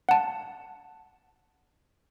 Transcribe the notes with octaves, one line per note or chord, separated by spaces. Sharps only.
F#5 A5